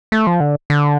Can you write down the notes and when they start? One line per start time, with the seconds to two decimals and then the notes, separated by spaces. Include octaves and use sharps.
0.12 A3
0.27 F3
0.40 D3
0.70 D3